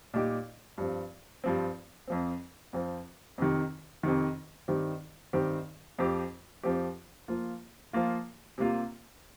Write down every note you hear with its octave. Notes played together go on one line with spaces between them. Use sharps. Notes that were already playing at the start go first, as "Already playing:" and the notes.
A#2 G3 D#4 G4
G2 F3 C4
G2 F3 C4
F2 F3 C4
F2 F3 C4
F2 C3 D#3
F2 C3 D#3
G2 D#3 C4 G4
G2 D#3 C4 G4
F2 F3 C4 G4
F2 F3 C4 G4
F3 A#3 F4
F3 A#3 F4
C3 G3 A#3 F4